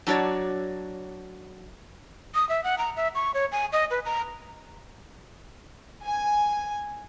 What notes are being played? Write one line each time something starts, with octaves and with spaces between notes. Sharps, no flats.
F#3 D4 F#4 C#5 D5
D#6
E5
F#5
A#5
E5
C#6
C#5
G#5
D#5
B4
A#5
G#5